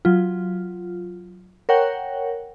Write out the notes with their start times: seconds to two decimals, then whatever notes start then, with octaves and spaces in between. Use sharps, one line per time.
0.05 F#3 F4
1.69 A#4 C#5 F#5 G5